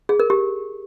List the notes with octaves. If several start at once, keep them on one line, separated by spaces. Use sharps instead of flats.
G#4
A#4
G4